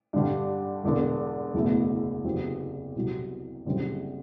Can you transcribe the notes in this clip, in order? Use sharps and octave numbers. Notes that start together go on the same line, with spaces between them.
G2 D3 G3
E1 E2 D3
F#1 E2 B2 A3 E4
F#1 E2 C3 F#3 C4
C2 C3 F#3
F#1 F#2 D3 G3 C4